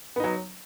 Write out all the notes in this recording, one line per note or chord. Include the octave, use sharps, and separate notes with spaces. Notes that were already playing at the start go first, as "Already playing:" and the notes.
F#3 B3 D#4